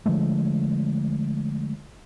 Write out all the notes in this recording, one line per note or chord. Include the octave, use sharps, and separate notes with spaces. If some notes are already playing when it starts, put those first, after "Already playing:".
D3 F3 G#3 A3